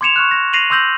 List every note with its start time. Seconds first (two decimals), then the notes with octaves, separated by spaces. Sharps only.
0.01 C6 D6 G#6 C#7 E7 F7
0.16 C#6 F6 F#6
0.31 A#6
0.53 A#6 C7 D#7 F7 F#7
0.70 C6 D6 E6 G6 A#6 F#7